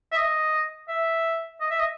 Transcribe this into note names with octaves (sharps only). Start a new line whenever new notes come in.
E5
D#5
E5
D#5
E5
D#5